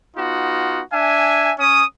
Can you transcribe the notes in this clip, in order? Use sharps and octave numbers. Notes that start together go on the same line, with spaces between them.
B3 D#4 F4 F#4
D4 E5 G#5
C#4 D#6